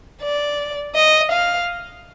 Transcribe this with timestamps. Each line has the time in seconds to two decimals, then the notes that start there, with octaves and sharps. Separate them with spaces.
0.22 D5
0.95 D#5
1.32 F5